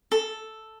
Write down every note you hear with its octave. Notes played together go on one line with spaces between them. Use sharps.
A4